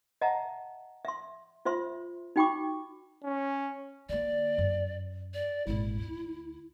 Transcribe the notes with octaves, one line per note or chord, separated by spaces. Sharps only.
D#5 E5 F#5 A5 A#5
E5 C6
F4 C5 E5 C6
D#4 F#4 G5 B5 C#6 D6
C#4
D3 A#3 D5
F#2
D5
G#1 A#2 E4
D2